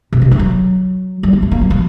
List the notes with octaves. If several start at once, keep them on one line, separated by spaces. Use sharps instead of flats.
C3
D3
E3
F#3
G3
G#3
A3
A#3
F#3
F3